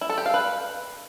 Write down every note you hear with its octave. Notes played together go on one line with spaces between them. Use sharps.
E4
A4
G4
F5
B4